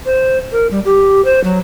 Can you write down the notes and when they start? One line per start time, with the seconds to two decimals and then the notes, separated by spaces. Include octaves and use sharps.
0.06 C5
0.52 A#4
0.71 G3
0.85 G4
1.25 C5
1.44 F#3